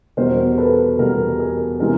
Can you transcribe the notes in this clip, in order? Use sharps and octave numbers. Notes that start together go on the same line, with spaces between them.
E2 B2 G3 A#4 C5
A4 B4
E2 B2 G3 G#4 A#4
G#4 A#4
C3 E3 G#3 G#4 A#4